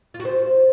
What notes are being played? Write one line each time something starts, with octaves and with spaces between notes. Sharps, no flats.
F4
F#4
C5